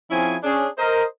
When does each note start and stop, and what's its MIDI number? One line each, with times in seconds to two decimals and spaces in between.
0.10 0.36 53
0.10 0.36 60
0.10 0.36 61
0.10 0.36 64
0.10 0.36 68
0.10 0.36 80
0.43 0.67 61
0.43 0.67 62
0.43 0.67 68
0.78 1.04 70
0.78 1.04 72
0.78 1.04 75